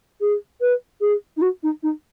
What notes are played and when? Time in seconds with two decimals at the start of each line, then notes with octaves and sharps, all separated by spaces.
0.20 G#4
0.60 B4
1.00 G#4
1.36 D#4
1.41 F#4
1.63 D#4
1.82 D#4